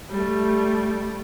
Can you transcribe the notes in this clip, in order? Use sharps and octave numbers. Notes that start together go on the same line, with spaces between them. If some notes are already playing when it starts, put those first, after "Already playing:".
G3 A3